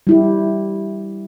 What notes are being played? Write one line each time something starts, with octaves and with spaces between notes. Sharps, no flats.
G3 E4 G4